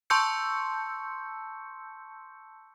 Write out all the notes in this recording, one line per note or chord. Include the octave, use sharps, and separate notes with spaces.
A5 C6 C#6 E6 G6 C#7